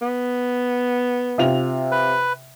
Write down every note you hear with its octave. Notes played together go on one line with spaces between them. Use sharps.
B3
C3 F4 F7
B4